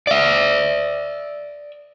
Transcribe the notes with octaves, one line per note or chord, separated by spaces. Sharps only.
D5 E5